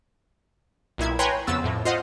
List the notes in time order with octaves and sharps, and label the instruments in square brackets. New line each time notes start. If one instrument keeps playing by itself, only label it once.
[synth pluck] B1 A#2 E4 G#6
B4 C#5 G5 G#5 A#5 C6
F2 C#3 B3 E6 A6
F2 A2
F4 C5 D#5 F#5